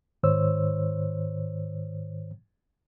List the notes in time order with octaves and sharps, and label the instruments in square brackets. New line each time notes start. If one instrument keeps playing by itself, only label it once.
[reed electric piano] G#2 D#3 C5 C#5 E6